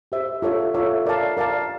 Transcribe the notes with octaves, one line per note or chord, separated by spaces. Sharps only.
G4 C5 E5
F4 A4 C#5 E5
F4 A4 C#5 E5
A#4 D5 F5 A5
A#4 D5 F5 A5